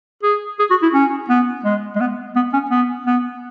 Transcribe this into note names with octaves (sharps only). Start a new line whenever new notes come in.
G#4
G#4
F#4
E4
C#4
B3
G#3
G#3
B3
B3
C#4
B3
B3